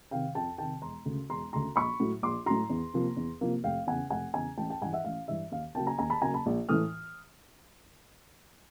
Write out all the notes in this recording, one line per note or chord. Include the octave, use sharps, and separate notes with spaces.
C3 D#3 F5 G5
F2 G5 A5
C3 D#3 G5 A5
E1 A#5 C6
D2 C#3
E1 A#5 C6
D2 C#3 A#5 C6
A#1 B5 C#6
A2 F#3
A#1 C6 D6
A2 F#3 A#5 C6
E2
C3 F3 A#3
E2
C3 F3 A#3
F1 F5 G5
E2 C#3 F#5 G#5
F1 F#5 G#5
E2 C#3 G#5 A#5
A1 G5 A5
G5 A5
G2 E3 F#5 G#5
E5 F#5
A1 F5
G2 E3 E5
D#2 F5
C#3 F#3 A#3 G5 A5
G#5 A#5
D#2 G#5 A#5
A5 B5
C#3 F#3 A#3 G#5 A#5
A5 B5
A#1
A2 E3 A3 D#6 F6